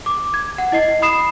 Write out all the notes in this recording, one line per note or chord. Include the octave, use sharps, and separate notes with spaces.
D6
G#6
F#5
E4 D#5 C7
B5 D#6 C7 E7